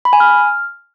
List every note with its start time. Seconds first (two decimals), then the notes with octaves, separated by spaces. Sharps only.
0.05 B5
0.13 G#5
0.20 F6